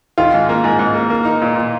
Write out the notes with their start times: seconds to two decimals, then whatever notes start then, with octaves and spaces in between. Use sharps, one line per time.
0.18 D#3 F4
0.34 G#2
0.49 A#3
0.64 G#2
0.79 G#2
0.94 A#3
1.10 A#3
1.25 D#4
1.42 A#2
1.56 A#2